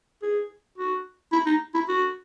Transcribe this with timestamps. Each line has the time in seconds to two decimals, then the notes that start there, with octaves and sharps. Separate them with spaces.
0.22 G#4
0.78 F#4
1.32 E4
1.46 D#4
1.74 E4
1.88 F#4